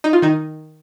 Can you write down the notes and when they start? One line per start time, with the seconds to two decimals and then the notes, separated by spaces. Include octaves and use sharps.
0.04 D#4
0.13 F4
0.22 D#3 D#4